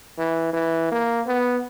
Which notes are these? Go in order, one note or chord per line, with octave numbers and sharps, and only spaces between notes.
E3
E3
A#3
B3